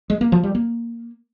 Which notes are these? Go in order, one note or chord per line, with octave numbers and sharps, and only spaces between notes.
G#3
A#3
F3
G3
A#3